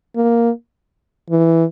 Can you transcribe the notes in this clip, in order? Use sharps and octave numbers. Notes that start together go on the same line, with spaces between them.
A#3
E3